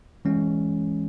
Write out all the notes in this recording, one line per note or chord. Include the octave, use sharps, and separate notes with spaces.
E3 G#3 C#4